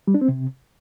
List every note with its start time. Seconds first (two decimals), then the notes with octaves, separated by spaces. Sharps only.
0.07 G3
0.14 D4
0.21 C4
0.28 C3